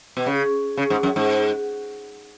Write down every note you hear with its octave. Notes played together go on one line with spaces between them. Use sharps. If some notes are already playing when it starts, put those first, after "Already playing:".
B2
C#3
C#3
G#2
F#2
G#2